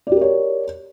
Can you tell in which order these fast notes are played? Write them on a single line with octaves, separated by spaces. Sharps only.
D5 G4 A#4 C#5